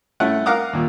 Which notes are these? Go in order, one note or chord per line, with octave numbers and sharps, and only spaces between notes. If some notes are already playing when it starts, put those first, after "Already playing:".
A3 C#4 E4 F#5
A#4 F5 F#5 A#5 D6 D#6
D#2 A#2